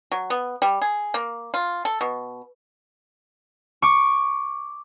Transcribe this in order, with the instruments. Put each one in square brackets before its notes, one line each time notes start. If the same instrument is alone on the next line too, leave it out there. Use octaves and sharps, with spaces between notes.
[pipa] F#3
B3
G3
G#4
A#3
F4
A4
B2
[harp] C#6 D6